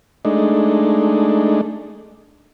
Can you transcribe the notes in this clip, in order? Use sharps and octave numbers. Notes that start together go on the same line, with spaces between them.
G#3 A3 D4 D#4